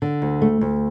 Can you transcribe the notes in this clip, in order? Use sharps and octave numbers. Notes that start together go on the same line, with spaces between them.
D3
D2
A3
D2